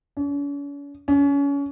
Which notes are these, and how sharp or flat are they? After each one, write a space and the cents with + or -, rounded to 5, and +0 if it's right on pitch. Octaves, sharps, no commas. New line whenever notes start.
C#4 +45
C#4 +30